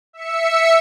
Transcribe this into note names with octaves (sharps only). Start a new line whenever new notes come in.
E5 E6 C#7